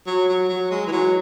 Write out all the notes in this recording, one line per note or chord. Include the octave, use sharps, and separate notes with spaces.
F#3
F#3
F#3
G#3
E3
F#3